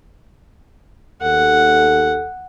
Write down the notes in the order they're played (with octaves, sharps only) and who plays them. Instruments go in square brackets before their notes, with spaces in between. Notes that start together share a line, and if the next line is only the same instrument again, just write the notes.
[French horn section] D#2 A4 [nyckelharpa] F#5